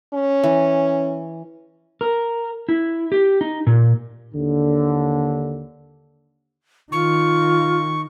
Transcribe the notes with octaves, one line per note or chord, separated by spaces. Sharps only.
C#4
E3
A#4
E4
G4
D#4
A#2
D#2 D3
D#3 F4 C#6